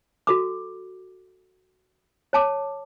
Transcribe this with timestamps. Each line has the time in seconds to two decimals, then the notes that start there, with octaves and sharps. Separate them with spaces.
0.27 F#4 A4 D6
2.33 C#5 A5 D6